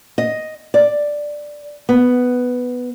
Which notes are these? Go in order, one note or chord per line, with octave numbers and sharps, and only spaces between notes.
D#5
D5
B3